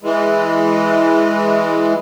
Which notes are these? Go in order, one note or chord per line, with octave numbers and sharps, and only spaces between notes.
E3 G#3